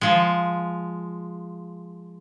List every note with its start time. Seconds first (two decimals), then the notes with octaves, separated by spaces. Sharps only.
0.01 F3 G#3